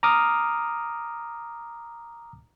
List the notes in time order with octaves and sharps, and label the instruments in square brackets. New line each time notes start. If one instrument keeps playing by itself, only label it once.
[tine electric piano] A#5 D6 D#6 F6